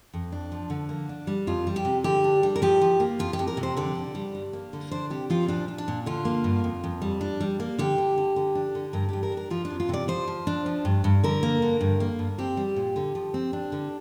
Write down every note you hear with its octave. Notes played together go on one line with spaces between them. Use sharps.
F2
D4
F3
D3
A#3
D4
G3
F2 F4
G3
G4
C3
D3 G4
D4
G3
A#4
F3 G4
F3
A#3
F2 F4
G4
F2
A#4
C3
C5
D3 D5
D3
G3
G2
A#3
D3
D4 C5
C3 G4
F3 F4
A#2 D4
D4
D4
A#2
D3 F4
A#3
G2
F2
F2
G3
D4
G3
A#3
D3 G4
D3
D3
D3
D4
D3
G2 A#4
G2 G4
A#4
D4
A#4
F3 F4
D4
F2
F4
C3 D5
F3 C5
F3
D4
F3
G2
G2
D3 A#4
A#3
D3
G2
A#3
G2
C4 G4
G3
A#2
D3
F3
C4
D4
D3